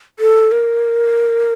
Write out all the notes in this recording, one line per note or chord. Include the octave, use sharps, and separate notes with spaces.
A4
A#4